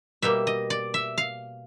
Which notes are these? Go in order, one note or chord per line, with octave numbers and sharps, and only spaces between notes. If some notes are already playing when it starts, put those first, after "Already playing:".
B2 G3 A#3 E5
D#5
D5
E5
F5